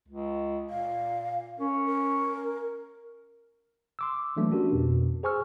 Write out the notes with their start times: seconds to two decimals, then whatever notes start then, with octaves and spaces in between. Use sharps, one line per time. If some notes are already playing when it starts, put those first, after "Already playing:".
0.08 C#2
0.70 A#2 F5
1.59 C#4 A#4
1.86 A#4
3.99 C6 D6 E6
4.37 E3 F#3 G3 A3 A#3 D4
4.51 C#4 D4 F#4 G4 A#4
4.73 F2 B2
5.23 G#4 C5 G#5 C#6 E6 F6